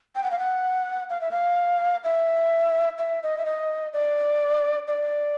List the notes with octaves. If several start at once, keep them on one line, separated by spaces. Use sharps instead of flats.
G5
F#5
F5
F#5
F5
E5
F5
E5
E5
D#5
E5
D#5
D5
D5